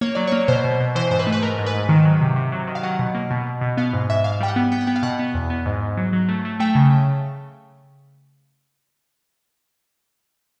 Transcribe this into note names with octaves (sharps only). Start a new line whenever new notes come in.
A#3 C#5
F#3 D5
A#3 C#5
B2 C5
B2
B2
E3 C5
G#2 C5
B4
A3
B4
G#2 A#4
G#2
B4
G#2
D#3
F#3
C3
C3
F#3
D#3
F5
F#3 F#5
B2
A#3
B2
B2
B2
B3 F5
G#2
G#2 E5
G#2 F5
G3 G5
F#5
B3
B3 G5
F#5
B3 G5
F5
B2 F#5
B3
E2
B3
G#2
G#2
F#3
F#3
A3
A3
A3 G5
C#3